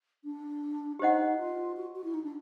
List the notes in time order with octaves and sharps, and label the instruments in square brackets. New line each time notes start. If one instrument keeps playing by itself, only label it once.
[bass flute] D4
[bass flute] D#4 [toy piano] G4 C5 D#5 F#5
[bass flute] F4
F#4
F#4
E4
D#4
D4